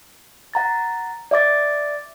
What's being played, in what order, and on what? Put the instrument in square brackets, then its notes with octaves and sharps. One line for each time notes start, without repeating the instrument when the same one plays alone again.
[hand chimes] F#5 A#5 A6
D5 E5 D6 A6